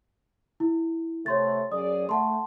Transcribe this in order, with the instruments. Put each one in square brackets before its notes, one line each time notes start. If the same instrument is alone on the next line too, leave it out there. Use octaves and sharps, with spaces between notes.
[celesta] E4
[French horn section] C3 A3 [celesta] C#5 C6 A6
[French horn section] F#2 G#4 D5 [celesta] D#6
[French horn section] A3 [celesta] F#5 A5 C6